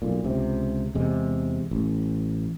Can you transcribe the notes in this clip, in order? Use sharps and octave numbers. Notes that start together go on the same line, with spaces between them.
B1 A#2
C#2 C3
E2 C3 G#3
A1